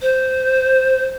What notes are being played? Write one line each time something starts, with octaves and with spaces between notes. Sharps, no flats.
C5